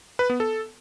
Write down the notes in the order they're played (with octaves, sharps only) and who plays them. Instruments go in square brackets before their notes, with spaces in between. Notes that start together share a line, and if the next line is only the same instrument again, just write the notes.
[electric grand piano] B4
B3
A4